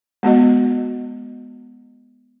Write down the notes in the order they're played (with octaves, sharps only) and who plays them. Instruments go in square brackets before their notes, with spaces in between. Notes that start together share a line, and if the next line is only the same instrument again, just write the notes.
[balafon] G#3 B3 F#4 D#5